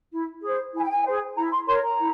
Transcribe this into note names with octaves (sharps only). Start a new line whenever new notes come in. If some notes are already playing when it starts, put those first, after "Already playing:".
E4
G#4 C5
E4 G#5
G5
G#5
G#4 C5
E4 A#5
C6
A#4 C#5 C6
A#5
E4